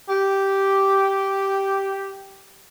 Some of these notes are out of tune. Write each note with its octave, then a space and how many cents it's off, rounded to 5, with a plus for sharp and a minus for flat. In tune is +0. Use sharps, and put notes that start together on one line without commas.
G4 -5